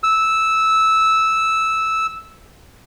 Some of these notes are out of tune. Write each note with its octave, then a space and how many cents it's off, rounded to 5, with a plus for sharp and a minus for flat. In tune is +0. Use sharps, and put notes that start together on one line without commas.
E6 -10